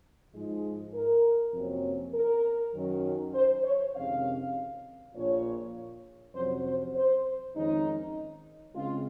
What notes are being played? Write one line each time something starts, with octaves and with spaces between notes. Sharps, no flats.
G#2 F3 G#3
A#4
F2 C3 F#3 A#3 C#4
A#4
F#2 D#3 F#3 C#4
C5
C#5
F2 C3 D#3 G#3 C#4 F5
A#1 A#2 F3 C#5
F2 C3 F#3 C#4 C5
C5
C5
F2 D#3 G#3 C#4 D#4
C#2 C#3 G#3 C4 F4